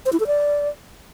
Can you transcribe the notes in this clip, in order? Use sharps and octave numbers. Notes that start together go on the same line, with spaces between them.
C5
E4
A4
D5